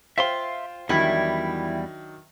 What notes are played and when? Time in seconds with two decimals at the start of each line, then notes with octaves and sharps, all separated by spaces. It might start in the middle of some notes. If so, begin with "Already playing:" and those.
0.18 F4 C5 E5 F5 G5 C6
0.89 E2 D#3 F#3 G3 D4 E4